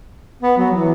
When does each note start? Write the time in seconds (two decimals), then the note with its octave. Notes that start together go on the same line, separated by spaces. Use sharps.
0.43 B3
0.58 F#3
0.72 E3